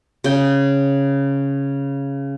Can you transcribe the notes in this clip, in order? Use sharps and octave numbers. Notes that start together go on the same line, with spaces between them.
C#3 G5